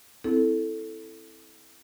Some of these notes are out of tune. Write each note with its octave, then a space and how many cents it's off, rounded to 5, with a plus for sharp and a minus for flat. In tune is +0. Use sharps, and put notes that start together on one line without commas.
C4 +0 E4 +0 A4 +0